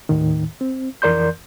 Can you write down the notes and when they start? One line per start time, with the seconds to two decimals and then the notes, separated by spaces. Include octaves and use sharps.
0.09 D#2 A2 D#3
0.61 C4
1.02 F2 E3 A#4 D5 C6 G6